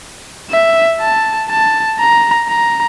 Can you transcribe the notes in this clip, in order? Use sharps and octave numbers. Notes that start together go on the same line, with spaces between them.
E5
A5
A5
A#5
A#5